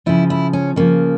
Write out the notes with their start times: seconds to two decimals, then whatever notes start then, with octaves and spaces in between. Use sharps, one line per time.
0.06 C#3 F3 E4
0.30 E4
0.53 C#4
0.76 C#3 F3 A#3